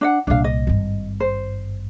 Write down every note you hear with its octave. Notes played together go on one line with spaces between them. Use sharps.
D4 D#5 F#5
C2 A#2 D4 F5
D#5
G#1 G2
C5